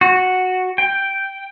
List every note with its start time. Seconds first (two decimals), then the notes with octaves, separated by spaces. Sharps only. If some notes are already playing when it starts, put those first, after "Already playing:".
0.01 F#4
0.78 G5